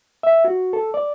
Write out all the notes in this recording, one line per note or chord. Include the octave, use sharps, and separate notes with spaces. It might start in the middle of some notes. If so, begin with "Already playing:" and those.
E5
F#4
A4
D5